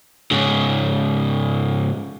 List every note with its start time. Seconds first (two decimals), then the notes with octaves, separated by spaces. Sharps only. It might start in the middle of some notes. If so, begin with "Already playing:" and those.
0.31 G#2 C#3